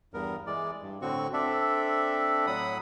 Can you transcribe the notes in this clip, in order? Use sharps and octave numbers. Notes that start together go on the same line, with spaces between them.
E2 G2 B3 A#4
E3 G#3 D5
G2
A2 D3 C4 F#4 C#6
C4 D4 A4 D5 E5
A2 F#3 F#5 B5 D#6